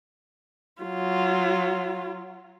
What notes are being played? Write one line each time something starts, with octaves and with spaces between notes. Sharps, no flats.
F#3 F4